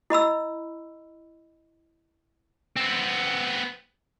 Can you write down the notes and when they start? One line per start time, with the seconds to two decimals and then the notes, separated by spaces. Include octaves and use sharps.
0.10 E4 D#5 B5 E6
2.76 B3 C4